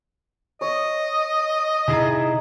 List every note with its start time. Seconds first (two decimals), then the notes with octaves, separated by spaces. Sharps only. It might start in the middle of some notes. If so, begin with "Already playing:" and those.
0.61 C#5 D#5
1.88 C3 D#4 E4 G#4 A5